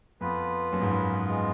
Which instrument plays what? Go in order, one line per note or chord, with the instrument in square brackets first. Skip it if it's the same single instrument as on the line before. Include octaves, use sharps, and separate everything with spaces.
[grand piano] F2 [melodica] B3 F4 B4
[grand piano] F#2
G#2
F#2
[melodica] G#3 B3 F4